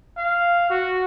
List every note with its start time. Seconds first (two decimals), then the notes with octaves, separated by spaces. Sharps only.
0.17 F5
0.71 F#4